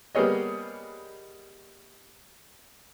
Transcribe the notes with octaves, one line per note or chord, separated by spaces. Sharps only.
G3 A#3 B3 G#4 C#5 D#5